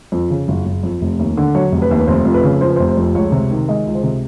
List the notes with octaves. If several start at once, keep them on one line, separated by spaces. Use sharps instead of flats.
F2
C#3
F#1
F#1
F2
F1
D#2
D3
F#3 C#5
F1
B4
D#2
B4
F1 C5
F2
B4
C#3
F3 C5
B4
C5
F1
C5
F2
C#2 C#5
C3
D#3
G#3 D#5
C#2
C5
C3